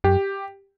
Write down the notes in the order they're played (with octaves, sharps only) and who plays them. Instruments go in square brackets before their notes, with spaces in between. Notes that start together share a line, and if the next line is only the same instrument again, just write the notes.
[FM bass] F#2 [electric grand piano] G4